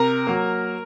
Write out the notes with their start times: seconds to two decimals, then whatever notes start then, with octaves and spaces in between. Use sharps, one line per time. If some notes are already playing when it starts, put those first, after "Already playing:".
Already playing: C3 A#4 A#5
0.27 F#3 A#3